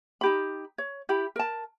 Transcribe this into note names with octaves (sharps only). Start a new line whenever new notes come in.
D#4 G4 B5
C#5
E4 G4 B5
A#4 A5